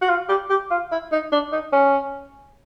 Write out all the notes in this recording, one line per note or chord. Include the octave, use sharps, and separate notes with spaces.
F#4
F4
G4
G4
F4
E4
D#4
D4
D#4
C#4